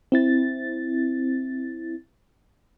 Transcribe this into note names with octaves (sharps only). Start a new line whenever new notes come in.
C4 E4 A6